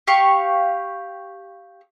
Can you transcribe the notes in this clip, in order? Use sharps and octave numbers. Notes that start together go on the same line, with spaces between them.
G4 F5 C#6